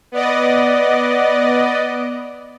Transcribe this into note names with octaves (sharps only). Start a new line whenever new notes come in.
B3 D5 D#5